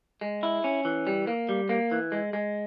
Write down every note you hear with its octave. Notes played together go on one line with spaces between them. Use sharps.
G#3
E4
C#4
E3
G3
A#3
G3
A#3
E3
G#3
G#3